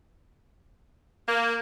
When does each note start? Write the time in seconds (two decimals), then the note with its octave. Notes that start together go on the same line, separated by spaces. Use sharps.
1.28 A#3